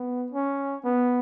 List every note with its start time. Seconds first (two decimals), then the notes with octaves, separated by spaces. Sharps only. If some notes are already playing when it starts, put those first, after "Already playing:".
Already playing: B3
0.32 C#4
0.85 B3